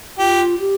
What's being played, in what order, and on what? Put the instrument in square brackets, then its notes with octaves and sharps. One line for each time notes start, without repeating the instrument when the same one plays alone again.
[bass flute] F4 [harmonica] G4
[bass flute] G4